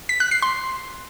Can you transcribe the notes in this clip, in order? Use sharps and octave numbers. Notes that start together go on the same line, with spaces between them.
B6
F#6
C7
C6